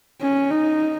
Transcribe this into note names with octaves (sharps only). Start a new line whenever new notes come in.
C#4
D#4